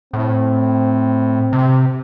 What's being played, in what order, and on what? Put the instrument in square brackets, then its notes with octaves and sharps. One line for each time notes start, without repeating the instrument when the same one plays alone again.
[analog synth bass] A2 [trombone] C4
[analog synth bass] C3